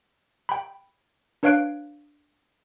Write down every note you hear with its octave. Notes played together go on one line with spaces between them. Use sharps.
G5 B5
D4 B4 C#5 F5 F#6 D7